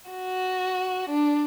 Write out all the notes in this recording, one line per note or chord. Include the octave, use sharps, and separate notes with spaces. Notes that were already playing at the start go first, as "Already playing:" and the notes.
F#4
D4